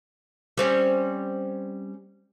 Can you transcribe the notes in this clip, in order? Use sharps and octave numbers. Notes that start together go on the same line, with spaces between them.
G3 C4 C#4